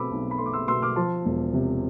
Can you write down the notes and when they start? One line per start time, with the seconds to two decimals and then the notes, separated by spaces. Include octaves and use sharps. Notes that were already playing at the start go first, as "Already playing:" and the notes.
Already playing: B2 A3 C4 B5 D6 E6
0.11 B1
0.31 B5
0.38 A3 C6
0.46 D6
0.53 C6 E6
0.68 B2 C6 E6
0.82 D6 F6
0.96 F3 A5 C6
1.26 E1
1.54 C3